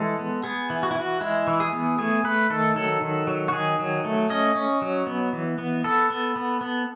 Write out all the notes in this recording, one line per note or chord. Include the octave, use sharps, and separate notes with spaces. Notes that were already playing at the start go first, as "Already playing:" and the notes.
Already playing: E3 G#3 A4
B3
B3 G#4
E3
F#4
E4
E3 F#4
G#3 E4
E3
G#4
B3
A3 G#4
A3 B4
D#3 A4
F#3 A4
D#3
F#3
F#4
D#3 G#4
F#3
A3
C#4 D#5
C#4
F#3
B3
E3
B3
B3 A4
B3
B3
B3